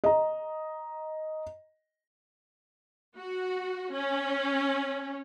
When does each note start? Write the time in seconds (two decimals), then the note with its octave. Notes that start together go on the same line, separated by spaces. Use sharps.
0.04 D#5 A#5
3.18 F#4
3.93 C#4